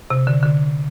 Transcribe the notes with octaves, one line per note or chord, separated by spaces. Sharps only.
C3
D3
D3